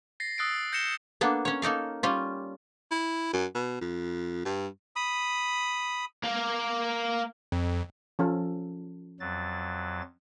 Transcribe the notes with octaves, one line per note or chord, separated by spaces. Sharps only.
A6 A#6 C7
D#6 E6 F#6 A6 C7 D7
G6 A#6 C#7 E7 G7
A#3 B3 D4 A4
C#4 C#5
A#3 D#4 A4 F5
G3 C#4 F4
E4
F#2
B2
F2
G2
B5 D#6
A#3 A#4
F2
F3 C#4 A4
F2 F#3 A6